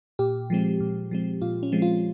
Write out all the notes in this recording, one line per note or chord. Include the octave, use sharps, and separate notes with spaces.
A#2 G4
F3 G#3 C4
A#2
F3 G#3 C4
A#2 F4
C#4
F3 G#3 C4
F4